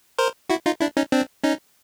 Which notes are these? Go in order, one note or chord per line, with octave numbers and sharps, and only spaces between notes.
A#4 C5
E4 F#4
D#4 F4
D4 E4
C#4 D#4
C4 D4
C#4 D#4